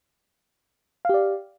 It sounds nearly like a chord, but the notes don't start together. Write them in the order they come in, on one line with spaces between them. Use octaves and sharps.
F5 G4 D5